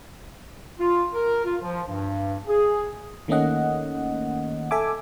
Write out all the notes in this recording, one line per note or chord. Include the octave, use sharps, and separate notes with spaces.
F4
A#4
F4
F3
G2
G#4
D#3 A3 A#3 C#4 D#5 F#5
A4 E5 G#5 D6